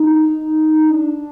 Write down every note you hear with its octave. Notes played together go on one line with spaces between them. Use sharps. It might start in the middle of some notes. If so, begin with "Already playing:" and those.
Already playing: D#4
D4